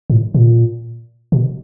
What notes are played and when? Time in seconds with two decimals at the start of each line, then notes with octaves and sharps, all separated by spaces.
0.10 A2
0.34 A#2
1.32 B2